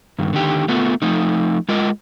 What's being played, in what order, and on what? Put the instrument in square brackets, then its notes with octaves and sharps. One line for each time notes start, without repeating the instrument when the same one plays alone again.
[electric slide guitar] G2 D#3
D3 D#3 G4
A3 B3 F4
F3 A3 D#4
G#3 F4 A#4 D#5